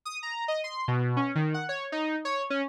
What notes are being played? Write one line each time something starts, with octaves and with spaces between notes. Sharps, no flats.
D#6
A#5
D#5
C6
B2
C#4
D#3
F#5
C#5
D#4
C#5
C#4